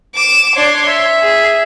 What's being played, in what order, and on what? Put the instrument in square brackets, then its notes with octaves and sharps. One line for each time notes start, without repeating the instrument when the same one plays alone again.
[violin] D6 E7
[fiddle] D4 D6 [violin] C#5 C6
[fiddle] E5
[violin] G#4